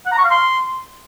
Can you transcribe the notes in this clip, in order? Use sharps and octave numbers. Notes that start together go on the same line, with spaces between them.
F#5
A#5
C#6
F5
C6